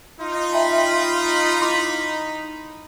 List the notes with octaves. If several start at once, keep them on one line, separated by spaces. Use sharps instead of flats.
D#4 F4
E5 G5 A5 B5
E4 C6 D6